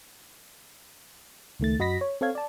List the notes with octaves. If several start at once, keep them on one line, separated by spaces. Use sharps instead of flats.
C#2 D#3 A3 A6
F#2 F#4 D#5 B5 A#6 B6
C#5
C4 A4 C#5 F5 G#6
D5 A5